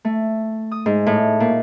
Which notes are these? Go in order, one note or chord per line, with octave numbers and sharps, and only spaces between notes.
A3
D#6
G#2
A2
A#2